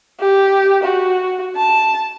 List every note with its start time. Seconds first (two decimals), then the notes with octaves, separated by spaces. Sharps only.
0.20 G4
0.83 F#4
1.56 A5